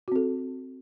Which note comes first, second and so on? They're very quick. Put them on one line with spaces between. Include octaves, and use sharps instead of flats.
F#4 C4 A4